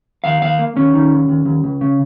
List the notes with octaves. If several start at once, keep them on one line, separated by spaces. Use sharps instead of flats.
D#2 F5
D#2 F5
A#3
D#2 C#4
D#3
D#2
D#2
D#2
C#2
C#3